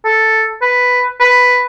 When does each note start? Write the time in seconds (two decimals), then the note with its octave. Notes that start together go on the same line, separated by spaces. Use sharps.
0.05 A4
0.62 B4
1.20 B4